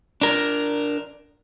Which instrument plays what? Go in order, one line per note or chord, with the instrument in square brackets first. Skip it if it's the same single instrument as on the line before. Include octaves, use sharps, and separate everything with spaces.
[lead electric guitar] D4 A#4